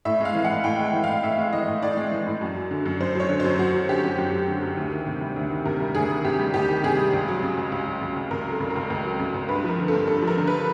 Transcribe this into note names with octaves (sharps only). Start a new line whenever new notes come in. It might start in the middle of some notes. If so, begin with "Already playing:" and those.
A2 E5
G#3 F5
E3
F#5
A2
A2 G5
G#3 G5
E3
A2 F5
A2 E5
G#3
E3 D#5
A2
A2 D5
G#3
E3
A2
F#2
F#3
D3
F#2
F#2 C5
F#3 C#5
D3
F#2 C5
F#2 F#4
F#3
D3 G4
F#2
F#2
F#3
D3
F#2
D2
D#3
C3
G3
D2
D#3
C3 A#4
G3
D2 G#4
D#3
C3 G4
G3
D2 G4
D#3
C3 G#4
G3
C#2
F#3
C#3
C#2
C#2
F#3
C#3
C#2
C#2 A#4
F#3
A4
C#3
C#2 A#4
C#2
F#3
C#3
C#2
G2 B4
F3 A#4
D3
G2 A4
G2 A4
F3
A#4
D3
B4